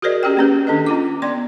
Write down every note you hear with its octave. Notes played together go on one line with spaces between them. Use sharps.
F#4 G#4 A#4 C5 D5 D#5
C#4 G4 G#4 G5
A#3 C#4 B4
D#3 D4 A4 D#5
C#4 F4 D6
B3 D5 C6